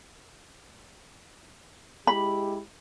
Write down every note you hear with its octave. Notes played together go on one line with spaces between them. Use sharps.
G#3 E4 G4 B5